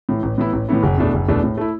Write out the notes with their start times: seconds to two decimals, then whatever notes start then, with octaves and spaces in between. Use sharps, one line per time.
0.09 A2 E3
0.23 A1
0.38 A2 E3 B3 E4
0.53 A1
0.69 A2 E3 B3 E4
0.83 F#1
0.98 E2 B2 A3 D4
1.14 F#1
1.28 E2 B2 A3 D4
1.43 A2
1.57 A3 E4